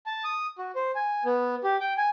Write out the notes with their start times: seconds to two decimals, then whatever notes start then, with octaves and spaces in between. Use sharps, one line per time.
0.06 A5
0.24 D#6
0.58 F#4
0.75 C5
0.95 G#5
1.25 B3
1.64 G4
1.80 G5
1.97 G#5